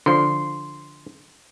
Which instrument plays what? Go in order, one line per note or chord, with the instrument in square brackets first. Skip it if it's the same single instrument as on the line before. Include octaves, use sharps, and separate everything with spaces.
[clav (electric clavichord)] D3 F3 [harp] C6